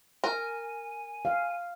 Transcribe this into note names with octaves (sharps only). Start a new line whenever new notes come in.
A#4 G#5
F5